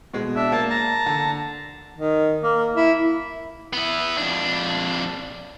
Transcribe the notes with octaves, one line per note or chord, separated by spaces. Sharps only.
B2 G#3
D4 E5
A#3 A5
A5 A#5
D3
D#3
A#3
E4
B3 E4
F2 D4